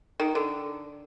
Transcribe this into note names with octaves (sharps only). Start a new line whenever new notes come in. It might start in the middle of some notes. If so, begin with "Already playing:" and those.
D#3
D3